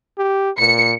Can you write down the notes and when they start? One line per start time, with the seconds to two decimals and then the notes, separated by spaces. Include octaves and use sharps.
0.18 G4
0.59 A#2 C#7